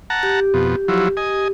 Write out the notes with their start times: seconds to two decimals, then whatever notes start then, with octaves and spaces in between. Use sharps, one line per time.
0.10 F#5 A5 A#5
0.23 G4
0.54 F2 B2
0.88 F3 F#3 E4
1.17 D#5 G#5